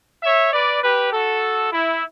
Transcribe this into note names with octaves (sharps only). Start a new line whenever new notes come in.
C#5 E5
B4 D5
G4 B4
F#4 A4
E4